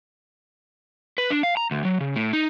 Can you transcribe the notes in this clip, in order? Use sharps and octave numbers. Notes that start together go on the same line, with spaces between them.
B4
D4
F5
A#5
D2
F#3
C#3
A2
D#4